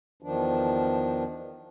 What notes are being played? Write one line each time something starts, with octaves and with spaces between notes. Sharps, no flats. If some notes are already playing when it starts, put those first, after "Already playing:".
E2 D#3 F3 D4